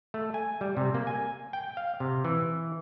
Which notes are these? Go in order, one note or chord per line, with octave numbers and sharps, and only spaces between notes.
A3
G#5
G3
C3
A#3
G#5
G5
F5
C3
E3